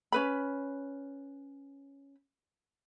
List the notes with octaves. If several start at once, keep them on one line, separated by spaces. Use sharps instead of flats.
C#4 B4 B5